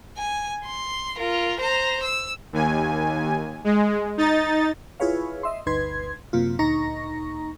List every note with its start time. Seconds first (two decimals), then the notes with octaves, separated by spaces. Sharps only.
0.17 G#5
0.65 C6
1.18 F4 A#4
1.59 C5 A#5
2.03 E6
2.53 D#2 G#5
3.64 G#3
4.17 D#4 A6
5.00 E4 F4 G#4 B4 C#5 F5
5.43 D#5 E5 C6
5.66 G1 D2 D#4 B4 C6 G#6
6.33 F#2 C3 A#3 F4
6.59 D2 A#2 D#4 A#5 C#6 A#6